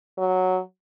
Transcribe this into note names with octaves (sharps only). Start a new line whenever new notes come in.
F#3